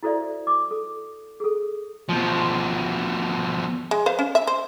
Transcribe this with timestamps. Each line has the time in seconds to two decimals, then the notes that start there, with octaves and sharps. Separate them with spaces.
0.03 E4 F#4 A4 C5 D5 E5
0.47 D6
0.71 A4
1.40 G#4 A4
2.09 B2 F3
3.91 G#3
4.06 B4 C5 F5
4.19 C#4
4.35 E5
4.47 C5